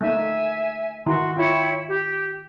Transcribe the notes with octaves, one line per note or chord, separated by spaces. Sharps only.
A3 A#3 D#4 E5 G#5
D#3 E4 F#4 C6
E4 F4 C#5 G5
G4